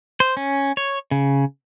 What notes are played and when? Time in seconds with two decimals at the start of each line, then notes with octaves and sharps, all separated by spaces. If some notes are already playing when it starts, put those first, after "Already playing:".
0.20 C5
0.37 C#4
0.77 C#5
1.11 C#3